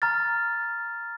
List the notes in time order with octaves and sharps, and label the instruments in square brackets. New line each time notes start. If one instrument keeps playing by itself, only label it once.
[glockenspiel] A#5 F6 A6